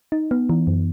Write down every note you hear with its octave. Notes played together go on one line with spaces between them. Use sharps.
D#4
B3
E3
F#2